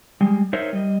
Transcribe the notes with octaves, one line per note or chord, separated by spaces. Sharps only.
G3 G#3
D#4 A#4 C5 C#5 E5
G3 D#5